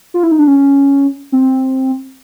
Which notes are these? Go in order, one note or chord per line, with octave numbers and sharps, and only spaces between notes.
F4
E4
D#4
D4
C#4
C4